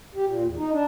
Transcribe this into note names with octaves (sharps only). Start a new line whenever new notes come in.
G4
A#2
E2
D#4
D4